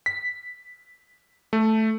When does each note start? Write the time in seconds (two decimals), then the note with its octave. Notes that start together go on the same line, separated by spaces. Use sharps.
0.06 B6
1.53 A3